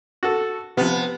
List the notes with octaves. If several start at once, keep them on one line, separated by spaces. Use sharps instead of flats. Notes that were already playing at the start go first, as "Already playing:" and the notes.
F#4 A4
C3 F3 B3